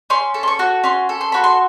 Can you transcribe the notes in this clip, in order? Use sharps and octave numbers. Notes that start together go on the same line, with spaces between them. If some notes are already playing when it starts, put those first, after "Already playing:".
C#4 C6
A4
C6
C#6
F#4
C#4 C6
A4
C6
F#4 B5
C6